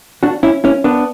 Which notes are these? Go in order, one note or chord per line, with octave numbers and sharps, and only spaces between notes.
D4 F#4
C#4 E4
C#4 E4
B3 D4